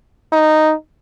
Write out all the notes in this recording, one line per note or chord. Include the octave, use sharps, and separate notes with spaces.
D#4